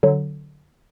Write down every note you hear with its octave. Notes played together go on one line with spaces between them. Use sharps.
D3 F#3